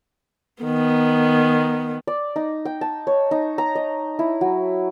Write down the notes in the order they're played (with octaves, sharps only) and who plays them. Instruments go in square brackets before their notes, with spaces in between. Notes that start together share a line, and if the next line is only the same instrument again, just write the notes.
[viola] D#3 B3
[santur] D5
D#4
G5
A5
C#5
D#4
A#5
D#5
E4
F#3